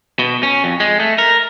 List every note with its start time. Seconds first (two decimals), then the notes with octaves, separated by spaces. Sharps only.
0.19 B2
0.43 C#4
0.64 F2
0.80 G#3
1.00 A3
1.18 A#4